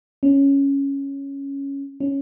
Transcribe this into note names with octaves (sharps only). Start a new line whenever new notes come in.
C#4
C#4